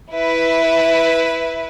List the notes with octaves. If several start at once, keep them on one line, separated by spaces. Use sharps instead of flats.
E4 B4